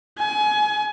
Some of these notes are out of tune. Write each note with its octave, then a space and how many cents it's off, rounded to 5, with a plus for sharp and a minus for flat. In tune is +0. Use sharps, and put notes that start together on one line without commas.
G#5 +25